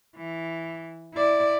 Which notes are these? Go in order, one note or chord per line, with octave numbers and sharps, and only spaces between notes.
E3
E4 D5